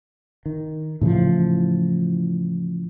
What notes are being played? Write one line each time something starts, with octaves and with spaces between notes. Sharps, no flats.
D#3
A2 C#3 E3 F3